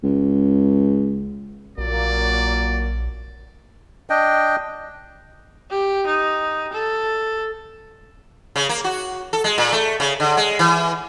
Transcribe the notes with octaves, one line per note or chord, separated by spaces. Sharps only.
C#2
A#1 A#2 F#3 A#3 D5
D4 D#5 G5
G4
D#4
A4
C#3
A#3
F#4
A4
G#3
A#2
A3
C#3
D3
G#3
E3